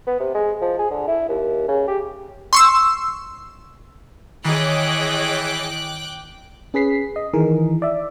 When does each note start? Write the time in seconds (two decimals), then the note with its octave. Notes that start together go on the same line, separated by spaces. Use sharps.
0.07 B3
0.20 C3
0.35 G#3
0.61 F3
0.79 G#4
0.90 D3
1.08 E4
1.29 D#2
1.68 C#3
1.88 G4
2.53 C6 C#6 E6
4.45 D#3 E3 G#4 C#5 D#5 G5 D6 F#6
6.74 C#4 G#4 B4 B6 C7
7.16 D#5
7.33 D#3 E3 G#4 A#4
7.82 D5 E5